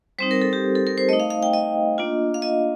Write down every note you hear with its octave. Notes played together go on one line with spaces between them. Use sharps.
G3 C4 D#4 C5
A#4
A4
G4
A4
A#4
C5
A3 D#4 D#5
F5
F5
G5
D#5
A#3 D4 F4
F5
D#5